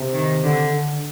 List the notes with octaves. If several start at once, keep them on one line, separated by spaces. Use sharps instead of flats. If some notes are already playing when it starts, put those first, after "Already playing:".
Already playing: C3
D#3
D3
D3